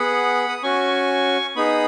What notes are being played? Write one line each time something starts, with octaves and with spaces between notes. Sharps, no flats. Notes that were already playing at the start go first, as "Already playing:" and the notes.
Already playing: B3 G#4 F#5 B5
D#6
C#4 F#4 G#5 C#6
B3 D#4 G#4 B5 D#6